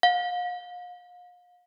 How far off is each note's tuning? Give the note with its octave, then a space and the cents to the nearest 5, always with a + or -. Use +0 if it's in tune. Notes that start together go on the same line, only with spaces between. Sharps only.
F5 +35